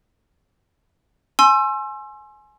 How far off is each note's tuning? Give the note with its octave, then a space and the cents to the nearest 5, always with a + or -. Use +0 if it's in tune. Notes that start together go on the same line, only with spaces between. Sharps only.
G#5 +20 C6 +30 E6 +25